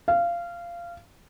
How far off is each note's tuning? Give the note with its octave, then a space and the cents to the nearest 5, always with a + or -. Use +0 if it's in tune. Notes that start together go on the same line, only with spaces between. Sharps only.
F5 -20